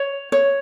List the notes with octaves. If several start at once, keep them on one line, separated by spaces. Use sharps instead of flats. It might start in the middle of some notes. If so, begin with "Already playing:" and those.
Already playing: C#5
C#5